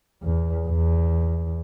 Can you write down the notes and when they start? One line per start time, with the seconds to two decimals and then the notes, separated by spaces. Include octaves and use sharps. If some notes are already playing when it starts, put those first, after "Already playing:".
0.23 E2
0.67 E2